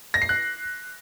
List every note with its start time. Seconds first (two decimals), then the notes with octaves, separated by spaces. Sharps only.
0.14 A#6
0.22 C7
0.29 F#6